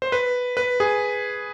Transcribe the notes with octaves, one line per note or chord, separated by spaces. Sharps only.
C5
B4
B4
G#4